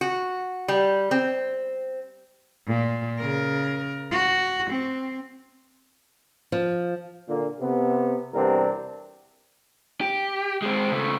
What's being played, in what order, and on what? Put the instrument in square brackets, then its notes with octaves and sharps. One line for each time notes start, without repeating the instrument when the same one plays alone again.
[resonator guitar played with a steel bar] F#4
G3
C4
[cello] A#2
C#3 A#4
F#4
C4
[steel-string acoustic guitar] F3
[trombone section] A#2 D3 A#3
C3 B3
E2 C3 G3 C4 D4 A#4
[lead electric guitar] G4
G#3 C4
C#3 A3